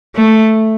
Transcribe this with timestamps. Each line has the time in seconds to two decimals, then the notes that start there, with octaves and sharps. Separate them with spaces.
0.15 A3